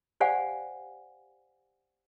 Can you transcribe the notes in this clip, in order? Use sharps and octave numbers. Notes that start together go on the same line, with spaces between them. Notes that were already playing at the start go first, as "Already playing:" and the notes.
G4 C5 D5 F5 F#5 G#5